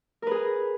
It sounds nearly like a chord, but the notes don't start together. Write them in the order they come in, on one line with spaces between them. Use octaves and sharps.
A#4 B4 G#4